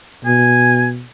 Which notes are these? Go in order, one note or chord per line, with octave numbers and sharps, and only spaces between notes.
B2 G#5